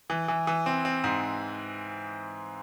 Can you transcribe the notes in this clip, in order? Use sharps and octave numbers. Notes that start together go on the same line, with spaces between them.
E3
E3
E3
C4
C4
G#2